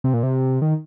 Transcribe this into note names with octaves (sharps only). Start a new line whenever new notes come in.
C3
A#2
C3
D#3